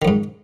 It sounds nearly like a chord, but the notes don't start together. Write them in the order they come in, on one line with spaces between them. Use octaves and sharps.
D#3 F2 G#2